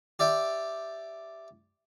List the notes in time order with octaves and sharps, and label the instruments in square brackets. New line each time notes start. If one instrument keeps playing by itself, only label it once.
[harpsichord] G4 D5 E5 G5